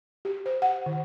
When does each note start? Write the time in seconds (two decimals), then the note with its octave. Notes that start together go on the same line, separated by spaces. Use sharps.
0.25 G4
0.46 C5
0.62 F#5
0.86 D#3